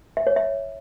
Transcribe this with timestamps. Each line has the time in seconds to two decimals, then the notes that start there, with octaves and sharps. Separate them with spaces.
0.17 E5
0.27 C#5
0.36 E5